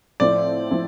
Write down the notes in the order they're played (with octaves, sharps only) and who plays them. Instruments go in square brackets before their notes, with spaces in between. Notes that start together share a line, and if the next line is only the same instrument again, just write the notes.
[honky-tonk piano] A2 F3 C4 E4 [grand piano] D5
[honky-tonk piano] F3 C4 E4